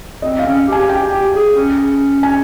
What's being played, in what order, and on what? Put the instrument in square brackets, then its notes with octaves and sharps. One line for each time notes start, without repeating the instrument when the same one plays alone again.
[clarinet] C4 [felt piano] D#5
[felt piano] F5
[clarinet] C#4
[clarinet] G4 [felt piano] G#5
[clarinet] G4 [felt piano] G5
[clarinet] G4
G#4
C#4
[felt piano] G#5